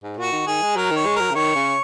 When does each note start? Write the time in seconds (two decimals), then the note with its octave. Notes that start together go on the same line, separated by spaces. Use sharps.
0.04 G#2
0.17 A#2 F#4
0.32 D#3
0.47 D#3 G#4
0.62 G#3
0.76 F#3 A#4
0.91 D#3
0.96 C#5
1.06 G#3
1.16 A#4
1.21 F#3
1.31 C#3
1.35 D#3 C#5
1.55 C#3